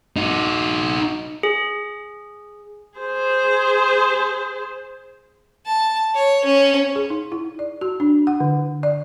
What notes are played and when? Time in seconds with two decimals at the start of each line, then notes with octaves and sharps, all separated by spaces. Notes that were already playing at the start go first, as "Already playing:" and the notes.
0.16 D#4 F#4
1.43 G#4
2.98 G#4 C5
5.66 A5
6.15 C#5
6.44 C#4
6.96 G#4
7.10 D#4
7.32 E4
7.59 D5
7.81 F#4
8.00 D4
8.27 F#5
8.40 D3
8.83 D5